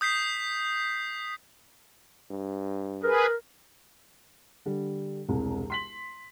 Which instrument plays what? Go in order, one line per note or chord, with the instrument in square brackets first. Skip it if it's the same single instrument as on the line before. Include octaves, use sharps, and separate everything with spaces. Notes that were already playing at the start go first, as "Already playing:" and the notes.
[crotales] D#6 G6 B6 C7
[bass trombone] G2
[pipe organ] G#4 B4 [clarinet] A#4
[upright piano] D3 G3
E1 C2 C3
C6 B6 F#7